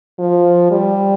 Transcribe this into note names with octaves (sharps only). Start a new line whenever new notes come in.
F3
G3